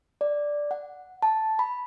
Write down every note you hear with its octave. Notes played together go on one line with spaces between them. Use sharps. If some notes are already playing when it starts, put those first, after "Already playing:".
D5
F#5
A5
B5